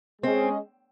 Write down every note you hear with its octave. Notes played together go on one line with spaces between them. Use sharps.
G#3 C4 C#4 G#4 D#5